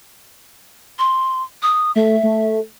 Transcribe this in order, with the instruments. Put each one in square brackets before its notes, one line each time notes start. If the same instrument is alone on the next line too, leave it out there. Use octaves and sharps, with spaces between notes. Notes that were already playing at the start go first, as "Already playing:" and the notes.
[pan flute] C6
D#6
[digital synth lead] A3 [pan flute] E5
[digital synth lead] A3